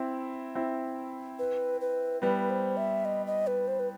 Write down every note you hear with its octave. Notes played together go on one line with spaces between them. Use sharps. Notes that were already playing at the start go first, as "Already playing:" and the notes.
Already playing: C4 E4
C4 E4
B4
B4
G3 B3 B4
C5
E5
D#5
D#5
B4
C5
B4